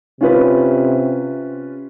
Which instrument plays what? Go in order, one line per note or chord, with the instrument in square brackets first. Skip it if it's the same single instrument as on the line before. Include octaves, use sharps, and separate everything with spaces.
[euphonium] C3 [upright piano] C#4 F4 B4